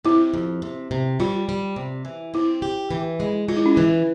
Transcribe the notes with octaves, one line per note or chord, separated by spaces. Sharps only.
C3 E4
F2
C3
C3
G3 F4
G3
C3
E3
C4 E4
G4
E3
G#3
G#3 F4
E4
C#4
E3 E4